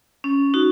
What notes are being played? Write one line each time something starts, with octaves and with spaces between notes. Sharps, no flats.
C#4
D#4 F#4